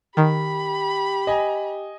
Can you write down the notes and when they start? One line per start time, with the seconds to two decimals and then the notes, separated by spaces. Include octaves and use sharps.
0.17 D#3 G4 B5
1.27 D#5 G#5